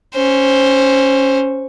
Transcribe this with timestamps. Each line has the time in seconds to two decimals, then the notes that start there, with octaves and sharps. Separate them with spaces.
0.14 C#4 C5